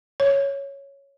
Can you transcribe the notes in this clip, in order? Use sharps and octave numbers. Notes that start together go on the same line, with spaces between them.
C#5